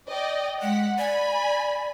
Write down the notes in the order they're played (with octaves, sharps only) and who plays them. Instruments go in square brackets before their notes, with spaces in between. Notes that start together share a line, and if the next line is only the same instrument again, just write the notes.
[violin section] D5 D#5 G5
[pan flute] G#3 [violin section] F#5 B6
[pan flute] D5 [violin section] G#5 B5